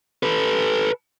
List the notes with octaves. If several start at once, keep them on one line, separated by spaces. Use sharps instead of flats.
A4 B4